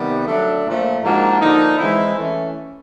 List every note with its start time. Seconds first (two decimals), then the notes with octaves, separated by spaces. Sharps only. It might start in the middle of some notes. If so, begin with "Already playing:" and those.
Already playing: C3 D#3 G3 B3
0.27 D3 F#3 A3 D4
0.65 A#2 F3 A3
1.03 G#2 F3 A#3 D4 F#4
1.40 D3 F3 A#3 D#4
1.78 E3 G#3 C4 E4
2.15 E3 A3 C#4